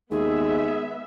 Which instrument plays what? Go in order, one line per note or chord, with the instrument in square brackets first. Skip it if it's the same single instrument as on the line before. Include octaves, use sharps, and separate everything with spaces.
[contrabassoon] D#2 [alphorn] G#3 [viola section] B3 E5 [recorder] G#4